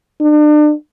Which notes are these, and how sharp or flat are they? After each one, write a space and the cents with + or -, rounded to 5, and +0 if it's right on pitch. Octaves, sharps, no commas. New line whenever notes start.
D4 +40